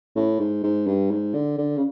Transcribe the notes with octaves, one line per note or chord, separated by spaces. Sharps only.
A2
G#2
G#2
G2
G#2
D3
D3
C#3